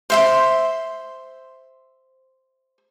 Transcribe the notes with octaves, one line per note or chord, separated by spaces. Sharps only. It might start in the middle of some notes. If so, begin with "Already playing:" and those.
C5 E5 C6